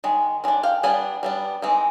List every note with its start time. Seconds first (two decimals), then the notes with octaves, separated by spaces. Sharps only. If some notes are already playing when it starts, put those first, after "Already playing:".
0.04 D#3 G#3
0.44 D#3 G#3 D4
0.63 F5 G5
0.83 G3 B3 D4 F#5 G#5
1.23 G3 B3 D4
1.62 E3 G#3 C4 D#4